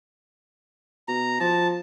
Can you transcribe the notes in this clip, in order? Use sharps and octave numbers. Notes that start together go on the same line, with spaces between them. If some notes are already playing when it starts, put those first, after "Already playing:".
B2 A#5
F3 A5